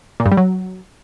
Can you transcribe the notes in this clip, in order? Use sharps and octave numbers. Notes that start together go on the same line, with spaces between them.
A#2
G2
G3
F#3